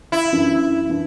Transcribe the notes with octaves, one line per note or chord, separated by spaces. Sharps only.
E4
F#2 E3 D4
E3 D4